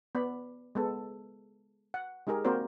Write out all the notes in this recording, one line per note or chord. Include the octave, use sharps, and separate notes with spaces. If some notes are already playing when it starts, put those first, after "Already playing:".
B3 D5 B5
G#3 B3 A4
F#5
G#3 D#4 G4 G#4 A#4
A#3 C4 F#4 A#4 C5 D5